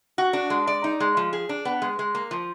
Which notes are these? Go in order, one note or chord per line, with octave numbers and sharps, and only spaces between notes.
F#4
D4
G#3
D5
D#4
G#3
F3
G#4
D4
B3
G#3
G#3
A#3
F3